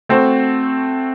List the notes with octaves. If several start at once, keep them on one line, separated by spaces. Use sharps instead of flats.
A3 C4 F#4 C5